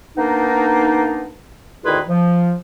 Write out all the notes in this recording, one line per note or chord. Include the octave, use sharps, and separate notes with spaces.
A#3 B3 D4 D#4
D2 D#3 E4 F4 G#4 B4
F3